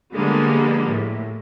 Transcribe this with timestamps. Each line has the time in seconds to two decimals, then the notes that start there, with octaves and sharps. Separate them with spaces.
0.14 D3 F3 G3 G#3 A#3 B3
0.88 A2